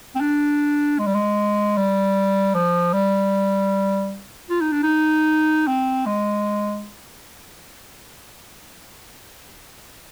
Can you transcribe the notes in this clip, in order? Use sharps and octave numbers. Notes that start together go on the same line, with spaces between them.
C4
D4
G#3
G3
G#3
G3
F3
G3
F4
D#4
D4
D#4
C4
G#3